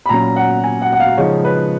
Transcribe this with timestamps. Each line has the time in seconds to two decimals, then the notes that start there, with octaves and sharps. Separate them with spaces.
0.06 B5
0.09 A#2 F#3 C#4 A#5
0.36 F#5
0.64 G#5
0.82 F#5
0.92 F#5
1.00 F5
1.18 C#3 F3 G#3 D#4 C#5
1.44 B4